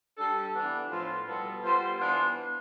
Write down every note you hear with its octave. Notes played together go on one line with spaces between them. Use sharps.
G3 D4 A4
E3 B3 D4
A2 F3 B3 F4
B2 G3 B3 F4 A4
G3 B3 F4 C5
E3 B3 D4 F4 C5